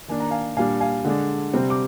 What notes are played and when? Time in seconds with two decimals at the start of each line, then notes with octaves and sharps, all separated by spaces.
0.08 D#3 A#3 D4 G#5
0.20 A#5
0.31 F5 G#5
0.57 A#2 G3 D4 F5 G#5
0.81 F5 G#5
1.05 D3 G#3 D4
1.54 C3 G3 C4
1.70 D6